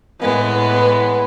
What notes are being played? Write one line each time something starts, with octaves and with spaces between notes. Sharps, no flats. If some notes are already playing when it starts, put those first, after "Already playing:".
A2 E3 G#3 B3